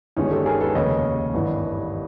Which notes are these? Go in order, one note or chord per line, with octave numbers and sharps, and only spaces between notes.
G1 G2 D#3 G#3 C#4 D#4
G4 A4
G#4 A#4
A4 B4
F1 D#2 C#3 C#5 D#5
G#1 G2 E3 G3